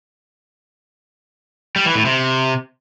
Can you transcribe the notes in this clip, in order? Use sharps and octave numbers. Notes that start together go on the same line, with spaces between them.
G3
E3
A2
C3